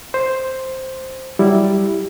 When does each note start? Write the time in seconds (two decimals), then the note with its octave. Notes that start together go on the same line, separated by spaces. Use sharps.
0.14 C5
1.39 F#3 G3 E4